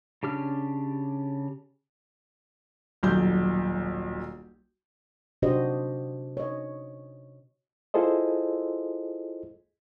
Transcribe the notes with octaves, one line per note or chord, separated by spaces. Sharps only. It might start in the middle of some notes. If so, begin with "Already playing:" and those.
C#3 D4 G4 F6
D#1 B1 G6
C3 D4 F#4 G4 C5 D#5
C#5 D#5
E4 F4 G#4 A4 C5 D#5